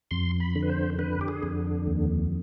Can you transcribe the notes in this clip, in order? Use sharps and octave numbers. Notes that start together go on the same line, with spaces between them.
F2 C6
B5
D3
B4
C5
D3 B4
G4
G#4
F2
D#2